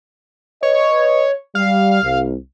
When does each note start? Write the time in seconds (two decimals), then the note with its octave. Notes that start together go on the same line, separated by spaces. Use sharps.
0.63 B4 C#5 D#5
1.55 G3 F5
2.02 C2